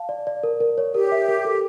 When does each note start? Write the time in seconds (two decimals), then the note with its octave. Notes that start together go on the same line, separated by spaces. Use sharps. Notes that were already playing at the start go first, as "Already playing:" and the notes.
Already playing: F5 A5
0.09 D5
0.27 D5
0.43 A#4
0.60 A#4
0.78 C#5
0.94 G4 A#4
1.12 E5
1.28 A#4
1.45 A4